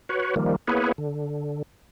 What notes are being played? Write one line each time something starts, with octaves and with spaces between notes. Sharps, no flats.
F#4 B4 C#5
D#3 F3 G3 A#3
A#3 B3 E4 G#4 B4 C#5
D3